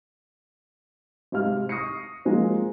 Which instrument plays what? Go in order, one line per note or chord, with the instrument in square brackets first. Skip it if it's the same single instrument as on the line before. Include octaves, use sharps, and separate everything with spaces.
[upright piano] G#2 C3 F5 F6
C#6 D#6 A#6 C7 C#7
F3 G#3 A#3 C4